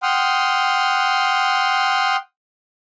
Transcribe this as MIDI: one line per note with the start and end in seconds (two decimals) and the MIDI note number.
0.03 2.16 78
0.03 2.16 79
0.03 2.16 84
0.03 2.16 87
0.03 2.16 89